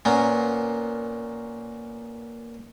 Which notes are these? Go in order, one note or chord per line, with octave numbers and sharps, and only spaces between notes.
A#2 A#3 B3 C#4